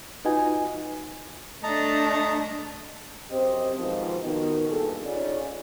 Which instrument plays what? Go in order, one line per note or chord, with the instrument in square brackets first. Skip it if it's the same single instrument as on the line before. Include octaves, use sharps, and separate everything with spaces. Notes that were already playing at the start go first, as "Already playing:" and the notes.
[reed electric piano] D#4 F4 F#4 B4 D#5 G#5
[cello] A3 D4 [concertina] D#5 A5 A#5
[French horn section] F#2 C4 G4 C5 D#5
G#2 B2 D#3 F3 F4
B2 D#3
G2 A#2 G#4 A4
C#3 C#4 D#4 F4 D5